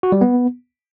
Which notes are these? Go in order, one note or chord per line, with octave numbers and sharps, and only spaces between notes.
F#4
G3
B3